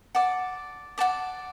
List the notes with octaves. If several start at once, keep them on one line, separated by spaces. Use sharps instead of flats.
D5 F#5 A5 D6
D5 F#5 A5 D6